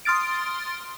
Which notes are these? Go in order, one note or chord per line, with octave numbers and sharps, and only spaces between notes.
C6 D#6 F6 A6 D7